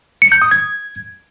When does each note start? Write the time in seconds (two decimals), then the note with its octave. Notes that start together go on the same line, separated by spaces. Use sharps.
0.22 C#7
0.32 G6
0.42 D#6
0.51 G#6